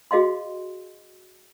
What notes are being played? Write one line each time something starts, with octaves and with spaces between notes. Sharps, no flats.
F#4 G#4 D#5 F5 C6